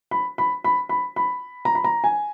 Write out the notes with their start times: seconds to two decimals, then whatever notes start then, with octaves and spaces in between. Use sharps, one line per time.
0.11 B5
0.38 B5
0.64 B5
0.89 B5
1.16 B5
1.65 A#5
1.75 B5
1.84 A#5
2.04 G#5